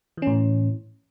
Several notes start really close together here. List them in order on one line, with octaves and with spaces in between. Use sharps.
E3 C#4 A2